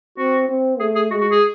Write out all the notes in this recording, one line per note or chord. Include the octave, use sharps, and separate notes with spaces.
C4 F#4
C4
A3 G#4
G#4
G#3 F#4
F#4
G#4